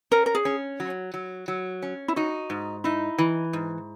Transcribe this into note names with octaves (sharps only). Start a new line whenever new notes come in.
C#4 A#4
A#4
G#4
C#4
F#3
F#3
F#3
C#4
E4
D#4 F#4
G#2
D#4 E4
E3
G#2